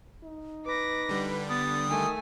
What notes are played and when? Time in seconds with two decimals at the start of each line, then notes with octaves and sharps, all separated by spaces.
0.24 D#4
0.66 B4 D6 A#6
1.09 D3 G3
1.49 B3 D#6 A6
1.89 D#3 A3 G#5